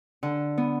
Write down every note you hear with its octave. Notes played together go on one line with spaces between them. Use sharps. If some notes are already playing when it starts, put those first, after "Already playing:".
D3
B3